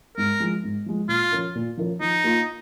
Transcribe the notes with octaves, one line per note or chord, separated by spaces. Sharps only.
G#2 A#4
F3 G#3
G#2
F3 G#3
A#2 F4
F3 C#4 A#4
A#2
F3 C#4 A#4
F3 D#4
A#3 F4